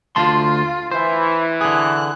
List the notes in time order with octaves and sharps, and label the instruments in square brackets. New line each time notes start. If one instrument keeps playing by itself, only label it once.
[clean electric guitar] D2 A5 C6 [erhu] F4
[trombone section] E3 [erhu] E4 [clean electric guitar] C5
[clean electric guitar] D3 G#4 [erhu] F#6